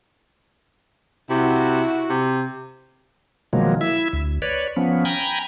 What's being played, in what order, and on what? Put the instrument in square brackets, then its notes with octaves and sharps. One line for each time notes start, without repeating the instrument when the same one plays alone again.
[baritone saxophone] C3 [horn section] E4 F#4
[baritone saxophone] C3
[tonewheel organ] B2 D#3 F3 F#3 G#3 A#3
E4 E5
D2
B4 C#5 D5
F3 B3 C#4
G5 G#5 A#5 B5